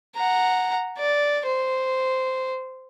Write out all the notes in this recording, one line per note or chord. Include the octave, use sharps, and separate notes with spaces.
F#5 A#5
D5
C5